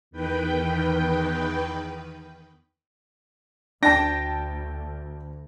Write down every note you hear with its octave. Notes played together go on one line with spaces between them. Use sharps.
E2 D#3 B4 G5
D2 D4 G5 A5 A#6